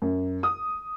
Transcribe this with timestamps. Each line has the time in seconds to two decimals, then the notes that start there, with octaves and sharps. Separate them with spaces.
0.02 F#2
0.43 D#6